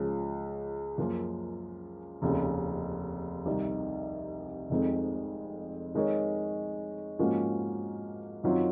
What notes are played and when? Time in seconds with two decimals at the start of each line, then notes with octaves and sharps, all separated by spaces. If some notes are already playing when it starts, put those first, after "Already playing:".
Already playing: C#2 C#3 F3
0.98 F#2 F3 A#3 F4
2.22 F1 D#2 C#3
3.46 C2 C3 D#3
4.70 F1 F2 D#3 G#3 C4
5.95 D#3 G#3 D#4 A#4 C#5
7.19 G#2 F3 A#3 C#4 F#4
8.44 F#2 D#3 F#3 C4 F4